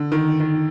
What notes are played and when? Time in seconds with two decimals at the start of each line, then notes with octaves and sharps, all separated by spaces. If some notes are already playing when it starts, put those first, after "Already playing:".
Already playing: D3
0.12 D#3
0.40 D#3